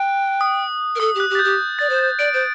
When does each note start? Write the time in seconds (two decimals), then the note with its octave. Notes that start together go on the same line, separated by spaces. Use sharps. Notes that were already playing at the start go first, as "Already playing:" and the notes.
Already playing: G5 F#6
0.41 D#6
0.95 A#4
1.00 A4 D#6
1.15 G4 F#6
1.30 G4
1.35 A6
1.39 G6
1.44 G4
1.79 D5 A6
1.89 C5
1.99 A6
2.19 D5 D7
2.34 C5